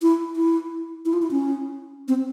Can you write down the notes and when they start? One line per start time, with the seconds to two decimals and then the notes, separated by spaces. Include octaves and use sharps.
0.02 E4
0.36 E4
1.05 E4
1.13 F4
1.22 E4
1.31 C#4
2.08 C4